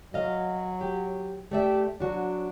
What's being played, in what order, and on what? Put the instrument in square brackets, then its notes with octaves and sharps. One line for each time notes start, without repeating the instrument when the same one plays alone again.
[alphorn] F#3 [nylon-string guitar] D#5 F5
[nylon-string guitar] G4
[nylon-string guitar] A3 D5 E5 [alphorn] G4
[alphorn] F#3 [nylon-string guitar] D4 F#4